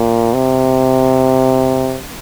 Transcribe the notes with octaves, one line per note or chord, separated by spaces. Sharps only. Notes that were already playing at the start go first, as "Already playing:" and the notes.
Already playing: A#2
C3